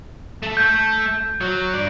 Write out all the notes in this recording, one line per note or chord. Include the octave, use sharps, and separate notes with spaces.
A3 A4
G6
F#3
G2 D5